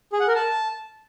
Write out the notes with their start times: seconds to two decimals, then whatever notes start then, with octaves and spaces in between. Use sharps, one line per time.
0.13 G#4
0.20 F#5
0.28 A#4
0.35 A5